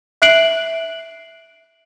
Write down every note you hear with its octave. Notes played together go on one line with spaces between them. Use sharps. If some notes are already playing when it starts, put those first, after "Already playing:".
E5 F#6 C7 D7 F#7